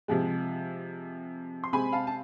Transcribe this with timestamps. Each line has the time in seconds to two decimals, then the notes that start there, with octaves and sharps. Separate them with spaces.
0.08 C3 F3 G#3
1.64 C6
1.73 C3 G#3 C4 G#5 B5
1.93 F5 A5
2.07 A5